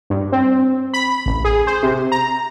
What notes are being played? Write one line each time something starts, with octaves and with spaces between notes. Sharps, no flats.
G2
C4
B5
A1
G#4
C5
C3
A#5